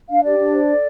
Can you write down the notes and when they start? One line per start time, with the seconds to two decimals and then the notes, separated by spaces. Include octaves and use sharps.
0.09 D4 F5
0.24 G4 D5
0.38 D4
0.53 C5
0.68 A4